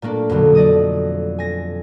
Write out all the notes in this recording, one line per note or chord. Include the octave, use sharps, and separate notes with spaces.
A#2 A3 A#3 D4
F2 B2 D3 F#3
D5 D#5 D#6
G#5 A#6